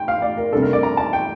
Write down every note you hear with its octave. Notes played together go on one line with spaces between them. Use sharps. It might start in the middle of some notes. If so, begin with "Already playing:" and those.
Already playing: G5
F5
D5
A#4
C3 G3 D4 A4
A#4
D5
A#5
A5
G5